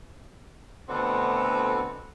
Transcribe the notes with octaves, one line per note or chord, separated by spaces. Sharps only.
D2 B2 D3 C4 A4 F#5